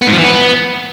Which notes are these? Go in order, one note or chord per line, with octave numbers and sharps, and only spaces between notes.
B3
G#2
F3
E3
B3